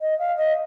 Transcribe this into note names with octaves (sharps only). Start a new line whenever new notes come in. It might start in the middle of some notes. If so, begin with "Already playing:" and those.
D#5
F5
D#5